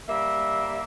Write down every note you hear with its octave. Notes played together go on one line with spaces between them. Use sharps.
G3 A#3 E5